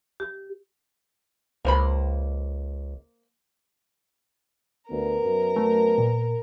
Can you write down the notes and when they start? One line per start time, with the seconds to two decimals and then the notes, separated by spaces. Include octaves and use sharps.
0.20 G4
1.65 C#2 A#3 C5 B5
4.91 D2 B3 A#4
5.23 F#2
5.56 A3
5.98 A#2